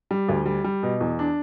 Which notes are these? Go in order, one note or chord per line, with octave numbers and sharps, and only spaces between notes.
G3
D2
G3
G3
B2
E2
D4